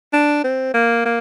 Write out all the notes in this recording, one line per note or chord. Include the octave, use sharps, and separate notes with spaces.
D4
C4
A#3
A#3